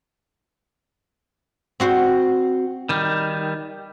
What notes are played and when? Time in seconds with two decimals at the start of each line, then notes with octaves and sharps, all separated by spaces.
1.80 C4 F#4 C5
2.89 D#3 G3